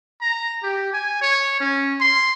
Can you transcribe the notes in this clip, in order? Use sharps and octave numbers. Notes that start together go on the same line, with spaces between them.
A#5
G4
G#5
C#5
C#4
C6